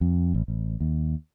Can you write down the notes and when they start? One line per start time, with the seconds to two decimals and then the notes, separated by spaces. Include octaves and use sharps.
0.01 F2
0.34 A1
0.48 A1
0.80 D#2